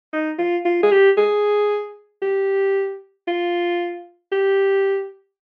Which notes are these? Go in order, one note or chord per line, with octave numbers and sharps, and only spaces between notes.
D#4
F4
F4
G#4
G4
G#4
G4
F4
G4